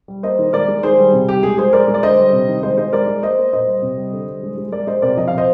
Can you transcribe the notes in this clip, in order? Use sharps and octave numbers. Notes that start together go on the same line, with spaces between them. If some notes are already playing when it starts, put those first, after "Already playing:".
G3
A#3 C5 D#5
D#3
G#3 A#4 D5
G#3
D#3 G#4 C5
G3
C3
G3 G4
G#3 G#4
G#3 G#4 C5
G#3 A#4 D5
G#3
D5
D3 C5 D#5
G3
C3
D#3
G#3 C5 D#5
G#3 C5 D#5
G#3 A#4 D5
G#3
A#3 C5 D#5
A#3
A#2 C5 D#5
G3
C3
G3
D3
G3
G#3
G#3
G#3 A#4 D5
G#3 C5 D#5
C3 A#4 D5
F3 D#5
C3 F5
C5 D#5